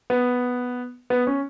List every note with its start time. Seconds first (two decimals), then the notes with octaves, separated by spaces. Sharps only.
0.10 B3
1.10 B3
1.27 C#4